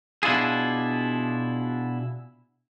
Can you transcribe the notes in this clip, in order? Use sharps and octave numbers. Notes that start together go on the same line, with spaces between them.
B2 D4 E4 F4 G#4